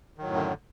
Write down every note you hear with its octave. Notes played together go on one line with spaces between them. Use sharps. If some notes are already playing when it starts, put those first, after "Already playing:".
F#2 A2 D3 D#3 F#3